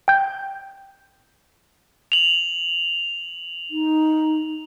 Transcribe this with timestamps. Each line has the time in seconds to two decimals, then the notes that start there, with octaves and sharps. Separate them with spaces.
0.08 G5 G6
2.12 F7 F#7
3.71 D#4